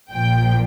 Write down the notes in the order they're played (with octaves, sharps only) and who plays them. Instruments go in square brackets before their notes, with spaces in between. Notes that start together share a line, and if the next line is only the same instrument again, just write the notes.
[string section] A#1 A#2 F3 G5